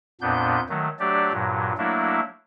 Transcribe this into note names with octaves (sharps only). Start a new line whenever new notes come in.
F2 A#2 B3 D4 G6
D#3 F#3 A3
F#3 A3 D4 G4 D5
G2 A#2 F#3
F#3 A3 A#3 D4 E4